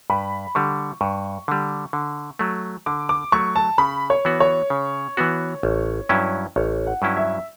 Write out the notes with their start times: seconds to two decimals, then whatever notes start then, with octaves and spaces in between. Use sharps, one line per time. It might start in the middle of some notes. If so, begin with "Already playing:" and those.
0.10 G2 B5
0.55 D3 G3 C#6
1.01 G2 C#6
1.48 D3 G3
1.93 D3
2.39 F#3 A3
2.86 D3 D6
3.09 D6
3.32 F#3 A3 C#6
3.56 A5
3.78 C#3 B5
4.10 C#5
4.25 E3 B3 F#4
4.40 C#5
4.70 C#3
5.17 E3 B3 F#4
5.63 A1
6.09 G2 F#3 C#4 E4
6.56 A1 C#5
6.87 F#5
7.02 G2 F#3 C#4 E4
7.17 E5